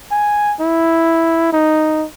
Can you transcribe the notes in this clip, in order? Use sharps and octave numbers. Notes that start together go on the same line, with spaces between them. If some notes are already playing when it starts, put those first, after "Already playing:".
G#5
E4
D#4